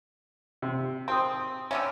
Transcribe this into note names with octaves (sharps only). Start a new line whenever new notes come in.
C3
C4 G5 C6 D#6
D3 G3 C#4 E5